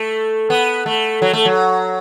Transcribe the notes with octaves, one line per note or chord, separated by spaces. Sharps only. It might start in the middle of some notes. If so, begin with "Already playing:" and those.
Already playing: A3
B3
A3
F#3
A3
F#3